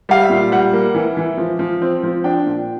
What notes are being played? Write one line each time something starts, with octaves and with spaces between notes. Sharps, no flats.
G3 F5
E5
A#2
G3 F#5
A#3
E3
E3
F3
F3
C4
F3
D4 G5
A#2